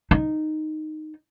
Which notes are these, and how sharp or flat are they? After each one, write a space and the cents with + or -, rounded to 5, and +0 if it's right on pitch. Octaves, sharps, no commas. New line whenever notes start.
D#4 -10